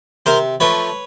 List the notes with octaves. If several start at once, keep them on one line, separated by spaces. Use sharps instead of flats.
C3 A#4 C5
F3 A3 B4 C#5